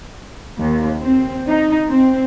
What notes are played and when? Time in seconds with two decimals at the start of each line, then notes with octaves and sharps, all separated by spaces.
0.59 D#2
1.00 C4
1.48 D#4
1.88 C4